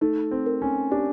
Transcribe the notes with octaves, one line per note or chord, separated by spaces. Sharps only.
A3 D#4
C4
A#4
C#4
D4 G4